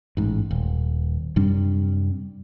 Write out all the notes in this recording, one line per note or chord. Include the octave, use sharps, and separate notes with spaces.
A1 G#2
D#1
F#2 C3 G3 D4